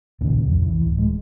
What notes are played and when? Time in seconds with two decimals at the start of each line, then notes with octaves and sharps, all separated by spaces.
0.21 D#2 A#2 C#3
0.45 C2 F2
0.62 E3
0.81 D1
0.98 G#3